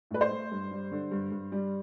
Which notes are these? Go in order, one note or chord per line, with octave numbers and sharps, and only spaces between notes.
A2 B4
C5
A3
G2
G3
D3
G2
G2
G3